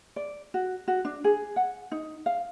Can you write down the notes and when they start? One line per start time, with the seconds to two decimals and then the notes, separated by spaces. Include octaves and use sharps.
0.16 D5
0.54 F#4
0.88 F#4
1.05 D4
1.24 G#4
1.56 F#5
1.92 D#4
2.26 F5